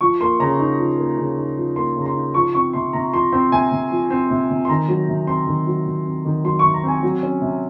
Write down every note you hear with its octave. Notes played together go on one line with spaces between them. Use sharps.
F3 C#6
A#3 C6
C#3 A#5
D#4
F3
A#3
C#3
D#4
F3
A#3 C6
C#3
A#5
C6
D#4
F3 C#6
C4 C#6
C3 C6
C3 A#5
F3 C6
C4 C6
C3 G#5
C3
F3
C4
C3
C3
C6
D#3 A#5
F#3
C3
C4 C6
D#3
F#3
C3
C4
D#3
F#3 C6
C3 C#6
A#5
C4 G#5
F#3
C#4
C3